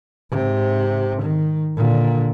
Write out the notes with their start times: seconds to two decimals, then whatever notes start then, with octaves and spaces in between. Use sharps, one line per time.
0.31 G#2 C3
1.22 D#3
1.76 A#2 D3